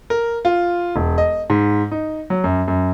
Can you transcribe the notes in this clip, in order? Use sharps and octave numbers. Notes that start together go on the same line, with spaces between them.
A#4
F4
E1
D#5
G#2
D#4
F#3
F#2
F#2